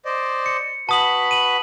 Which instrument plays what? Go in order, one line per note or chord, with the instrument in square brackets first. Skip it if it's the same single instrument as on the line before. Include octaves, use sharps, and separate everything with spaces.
[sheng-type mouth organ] C5 D5 D#5
[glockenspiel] C#7
[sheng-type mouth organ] F#4 B4 B5 [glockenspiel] A5 D#6 F#7
[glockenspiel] D#7 F#7